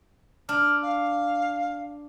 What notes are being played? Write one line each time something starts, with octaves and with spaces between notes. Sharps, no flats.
D4 F6
F5